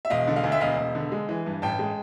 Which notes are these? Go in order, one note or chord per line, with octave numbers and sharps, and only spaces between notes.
E5
E1 D#5 F5
D3
D#5 F5
D2
E5
E1 D#5 F5
E1
D3
G#3
E3
G2
A1 G5 A5
G#3